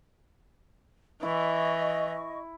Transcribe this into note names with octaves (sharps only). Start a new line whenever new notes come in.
E3 E4 D#5 C#6